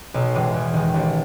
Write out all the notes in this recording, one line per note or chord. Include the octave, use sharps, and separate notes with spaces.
B1
A2 E3 G#3
E2
D#3 G#3
A1